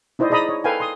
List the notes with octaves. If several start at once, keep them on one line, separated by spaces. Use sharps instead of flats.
D#4 E4 C5 D5 D#5
G#4 D5 D#5 A#5 B5 D#6
C#5
A4 B4 F5 G5 G#5
C6 D#6